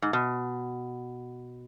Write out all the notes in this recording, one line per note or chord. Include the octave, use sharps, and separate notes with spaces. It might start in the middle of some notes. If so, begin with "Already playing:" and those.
G#2
B2